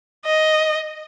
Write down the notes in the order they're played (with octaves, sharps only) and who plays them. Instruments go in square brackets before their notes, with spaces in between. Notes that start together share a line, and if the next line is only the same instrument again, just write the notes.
[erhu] D#5